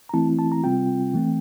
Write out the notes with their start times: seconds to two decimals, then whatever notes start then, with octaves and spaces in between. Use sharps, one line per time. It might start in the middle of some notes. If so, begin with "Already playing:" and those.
0.09 A#5
0.14 E3 A3 C4 E4 A5
0.39 A5
0.52 A#5
0.64 C3 G3 C4 F4 G5
1.14 E3 A3 C4